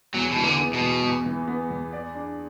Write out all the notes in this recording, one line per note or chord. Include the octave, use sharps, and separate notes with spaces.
E2 F#3
B2 E3
D3
B3
B2
E2
E2
E3
B3
E2
D5
D4